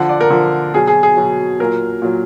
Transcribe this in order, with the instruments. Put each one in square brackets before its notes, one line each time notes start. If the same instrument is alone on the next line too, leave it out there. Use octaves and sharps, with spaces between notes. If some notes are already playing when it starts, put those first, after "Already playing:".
Already playing: [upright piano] D3 F3 F#5
D5
A#4
D3 F3
B2 F#3 G#4
G#4
G#4
B2 F#3
A#2 F#3 A#4
A#2 F#3